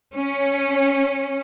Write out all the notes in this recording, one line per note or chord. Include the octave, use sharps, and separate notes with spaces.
C#4